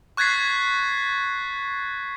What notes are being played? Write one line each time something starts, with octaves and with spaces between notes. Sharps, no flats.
C#6 F#6 G#6 A6 B6 C7